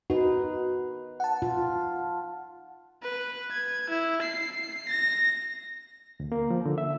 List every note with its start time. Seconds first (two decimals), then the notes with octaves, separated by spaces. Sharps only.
0.10 D#4 F#4 B4
1.20 F#5 A5
1.42 F4
3.03 B4
3.51 G#6
3.90 E4
4.22 C7
4.89 A#6
6.20 D2
6.32 A#3
6.50 F3
6.65 D3
6.78 E5